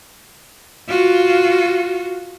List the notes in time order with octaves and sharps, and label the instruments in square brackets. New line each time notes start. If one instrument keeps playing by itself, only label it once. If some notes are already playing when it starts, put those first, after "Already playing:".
[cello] F4 F#4